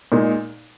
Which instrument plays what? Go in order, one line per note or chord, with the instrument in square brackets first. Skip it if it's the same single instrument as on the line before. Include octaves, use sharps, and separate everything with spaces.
[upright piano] A#2 G#3 D#4